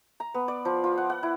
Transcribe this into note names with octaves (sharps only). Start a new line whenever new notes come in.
A#5
B3
D5
F3
F4
F#5
F#5
E4